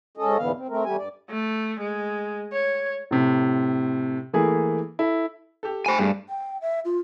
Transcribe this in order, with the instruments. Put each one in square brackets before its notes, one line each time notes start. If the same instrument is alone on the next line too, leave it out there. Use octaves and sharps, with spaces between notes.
[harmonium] G#2 C#4 A4 D#5
D#2 G#2 D3 E3 B3 F5
C4
A3 C4 A#4
E2 G3 A3 G4 G#5
G2 D5
[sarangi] A3
G#3
C#5
[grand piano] A2 C3
E3 A3 A#3 G#4
E4 A4
[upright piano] G4 A4
[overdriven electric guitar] C5 G#5 [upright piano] G5 B5 C#6
[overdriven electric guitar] G2 [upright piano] G3 A3 G#4
[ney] G5
E5
F4